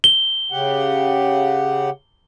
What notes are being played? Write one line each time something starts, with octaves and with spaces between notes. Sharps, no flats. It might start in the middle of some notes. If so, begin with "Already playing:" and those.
G7
C#3 G4 F#5